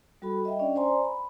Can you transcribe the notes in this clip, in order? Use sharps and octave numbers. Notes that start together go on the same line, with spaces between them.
G3 F#4 A4 B5
D#5 E5 G5
C#4 D4 D5
C5 D5 G#5 A#5 C6
B5